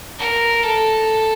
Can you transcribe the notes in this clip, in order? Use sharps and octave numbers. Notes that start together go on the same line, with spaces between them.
A#4
A4